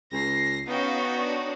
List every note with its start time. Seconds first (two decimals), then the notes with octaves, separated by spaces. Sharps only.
0.12 C#2 A#6 C7
0.67 B3 C#4 D#4 F#4 F5 G5
1.14 D4 C#5